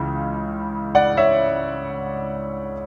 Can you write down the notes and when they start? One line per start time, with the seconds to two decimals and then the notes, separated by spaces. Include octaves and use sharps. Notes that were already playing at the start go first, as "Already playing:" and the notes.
Already playing: C#2 C#3 E3
0.95 D5 F#5
1.17 C#5 E5